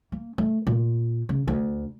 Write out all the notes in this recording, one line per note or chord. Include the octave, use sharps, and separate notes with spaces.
A#3
A3
A#2
C#3
D2